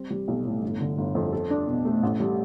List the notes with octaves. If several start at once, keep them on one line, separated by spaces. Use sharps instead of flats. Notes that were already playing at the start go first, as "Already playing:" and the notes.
Already playing: G3 C4
G3
B1
A2
G1
D3
G1
F2
A4
D4
B2
A3
A1
G3